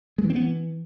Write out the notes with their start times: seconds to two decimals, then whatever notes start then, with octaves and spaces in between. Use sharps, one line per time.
0.18 G#3
0.24 E3
0.30 C4
0.35 B3
0.41 E3